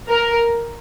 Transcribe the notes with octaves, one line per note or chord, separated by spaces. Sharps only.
A#4